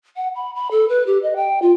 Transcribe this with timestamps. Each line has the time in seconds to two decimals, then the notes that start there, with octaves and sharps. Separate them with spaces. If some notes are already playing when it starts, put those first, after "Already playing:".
0.16 F#5
0.35 B5
0.55 B5
0.71 A4
0.88 B4
1.06 G4
1.23 D#5
1.36 G5
1.62 F4